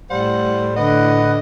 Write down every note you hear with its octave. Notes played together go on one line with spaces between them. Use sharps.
A2 G3 C5 F#5
D3 B4 D#5 F#5